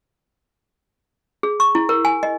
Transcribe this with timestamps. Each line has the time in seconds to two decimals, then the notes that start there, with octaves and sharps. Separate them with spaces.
1.43 G#4
1.60 C#6
1.75 E4
1.89 A#4
2.05 G#5
2.23 D#5